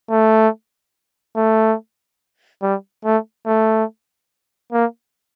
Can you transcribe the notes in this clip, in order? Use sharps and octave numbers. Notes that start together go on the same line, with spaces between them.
A3
A3
G3
A3
A3
A#3